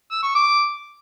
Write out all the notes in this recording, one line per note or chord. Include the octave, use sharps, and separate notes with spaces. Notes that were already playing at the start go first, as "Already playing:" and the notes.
E6
C#6
D6